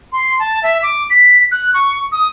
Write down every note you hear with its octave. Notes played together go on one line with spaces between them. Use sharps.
C6
A5
E5
D6
B6
F#6
C#6
D#6